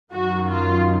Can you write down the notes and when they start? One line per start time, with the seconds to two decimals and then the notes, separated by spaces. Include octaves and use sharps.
0.13 F#2 D#3 F#3 F#4
0.50 F4